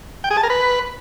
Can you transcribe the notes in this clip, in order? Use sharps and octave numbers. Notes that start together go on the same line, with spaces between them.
G5
G#4
A5
A#4
B4